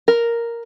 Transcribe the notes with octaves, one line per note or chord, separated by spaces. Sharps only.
A#4